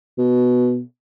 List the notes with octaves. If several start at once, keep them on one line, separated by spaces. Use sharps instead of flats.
B2